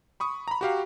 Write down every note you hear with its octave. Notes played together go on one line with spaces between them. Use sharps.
B5 C#6 D#6
A#5 B5
F#4 G4 F5